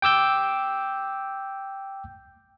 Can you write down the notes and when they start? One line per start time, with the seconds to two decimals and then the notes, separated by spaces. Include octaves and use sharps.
0.02 G5 D6 E6 G6